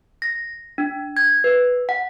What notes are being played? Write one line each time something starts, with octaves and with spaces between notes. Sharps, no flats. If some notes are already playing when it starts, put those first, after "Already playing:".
A#6
D4
G#6
B4
F#5